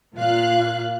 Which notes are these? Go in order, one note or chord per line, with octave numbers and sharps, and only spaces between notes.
A#2 F4 F5 F#6